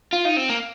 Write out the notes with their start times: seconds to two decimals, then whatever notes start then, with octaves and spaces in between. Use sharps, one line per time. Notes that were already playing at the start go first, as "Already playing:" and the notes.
0.13 F4
0.25 D#4
0.37 C4
0.50 A#3